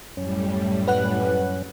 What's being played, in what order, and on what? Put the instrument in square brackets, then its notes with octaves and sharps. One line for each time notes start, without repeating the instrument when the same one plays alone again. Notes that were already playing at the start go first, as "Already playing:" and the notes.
[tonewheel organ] F#2 C#4 [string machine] A2 G3
[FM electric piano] B4 F#5 F#6